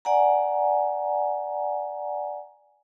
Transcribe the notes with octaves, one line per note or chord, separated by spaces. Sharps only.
D5 F#5 G#5 A#5